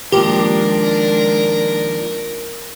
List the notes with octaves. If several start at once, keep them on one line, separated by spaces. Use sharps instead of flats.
D#2 F3 G#3 D4 G4 A#4